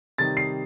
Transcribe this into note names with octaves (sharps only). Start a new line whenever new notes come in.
C3 D#3 G3 A6
C7